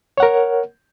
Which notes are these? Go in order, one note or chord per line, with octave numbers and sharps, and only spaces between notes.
A#4 C#5 F#5